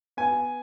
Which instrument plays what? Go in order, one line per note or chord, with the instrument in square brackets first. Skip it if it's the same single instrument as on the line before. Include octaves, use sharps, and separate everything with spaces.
[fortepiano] B3 G#5